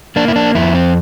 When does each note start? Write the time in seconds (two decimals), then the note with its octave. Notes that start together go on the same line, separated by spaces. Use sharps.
0.16 A#3 D4
0.28 E4
0.36 D4
0.55 F2 E4
0.75 C4